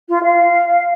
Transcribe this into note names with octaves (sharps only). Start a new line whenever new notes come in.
F4
F5